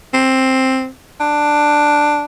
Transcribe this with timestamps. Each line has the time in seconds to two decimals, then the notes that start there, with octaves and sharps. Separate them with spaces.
0.14 C4
1.20 D4